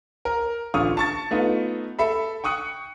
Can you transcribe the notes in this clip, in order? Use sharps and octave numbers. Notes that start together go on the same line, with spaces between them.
A#4
A1 D3 F4 C#6 D#6 F6
A5 C#6 A6
A3 B3 D#4 F4
A4 E5 B5
G5 C#6 D#6 F#6 C#7